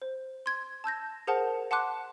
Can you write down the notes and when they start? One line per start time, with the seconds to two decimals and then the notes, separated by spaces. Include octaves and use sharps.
0.02 C5
0.46 C6 G#6
0.84 A5 E6 G6 A#6
1.27 G#4 A#4 C5 F#5 A5
1.71 F#5 A5 C6 D6 F#6